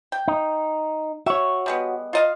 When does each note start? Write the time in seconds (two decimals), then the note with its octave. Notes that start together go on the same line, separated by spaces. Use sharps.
0.12 G5
0.28 D#4
1.26 F#4 C#5 E5
1.66 G3 G#3 B3
2.13 F4 D#5 F5